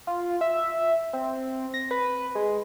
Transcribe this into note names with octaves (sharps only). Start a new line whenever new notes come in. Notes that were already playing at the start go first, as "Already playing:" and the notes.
F4
E5
C4
A#6
B4
G#3